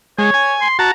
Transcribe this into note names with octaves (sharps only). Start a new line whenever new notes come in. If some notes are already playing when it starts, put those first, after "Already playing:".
G#3 C#5
G#5
C6
F#4 A5 A#5